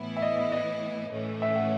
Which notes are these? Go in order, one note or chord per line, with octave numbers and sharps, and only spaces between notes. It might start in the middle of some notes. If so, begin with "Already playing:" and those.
Already playing: A2 E3 B3 E4
E5
D#5
D#5
D#5
A2 E3 A3 C#4
E5
F#5